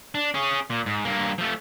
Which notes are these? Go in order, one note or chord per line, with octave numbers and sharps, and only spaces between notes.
D4
C#4 G#4
A#2
G#2
G2 A#3
F3 A3